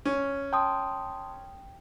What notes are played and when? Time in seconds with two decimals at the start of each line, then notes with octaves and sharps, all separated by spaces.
0.05 C#4
0.53 G5 A5 C6 D#6